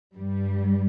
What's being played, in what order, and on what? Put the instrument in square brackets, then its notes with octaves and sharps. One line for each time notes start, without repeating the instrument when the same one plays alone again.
[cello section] G2 G3